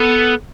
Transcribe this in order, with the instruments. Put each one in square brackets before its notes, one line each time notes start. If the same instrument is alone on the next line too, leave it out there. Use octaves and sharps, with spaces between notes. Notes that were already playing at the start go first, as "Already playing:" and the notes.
Already playing: [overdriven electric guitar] B3 [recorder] A4